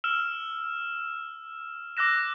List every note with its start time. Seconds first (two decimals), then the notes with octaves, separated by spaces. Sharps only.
0.04 E6 F6 E7
1.97 D6 E6 F#6 A#6 E7